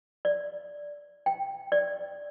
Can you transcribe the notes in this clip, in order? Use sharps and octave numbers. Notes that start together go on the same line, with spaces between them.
D5
G5
D5